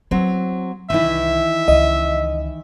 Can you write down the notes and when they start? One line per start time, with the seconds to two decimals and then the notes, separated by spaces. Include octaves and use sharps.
0.11 F#3 C4 E4
0.90 C2 D#3 E3 E4 E5
1.68 C#2 D3 D#5